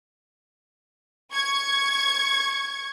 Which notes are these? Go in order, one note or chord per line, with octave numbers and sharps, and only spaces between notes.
C#6 G#6